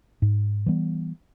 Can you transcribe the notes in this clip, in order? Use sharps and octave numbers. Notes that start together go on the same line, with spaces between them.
G#2
E3 G3 B3